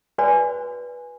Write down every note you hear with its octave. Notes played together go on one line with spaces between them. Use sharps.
F#4 B4 C5 D5 G#5